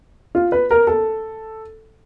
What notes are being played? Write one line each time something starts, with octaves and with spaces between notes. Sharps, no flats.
F4
B4
A#4
A4